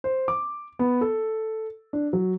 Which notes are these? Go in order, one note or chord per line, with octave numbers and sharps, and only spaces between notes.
C5
D6
B3
A4
D4
F#3